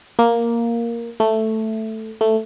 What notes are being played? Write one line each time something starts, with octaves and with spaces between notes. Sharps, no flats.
A#3
A3
A3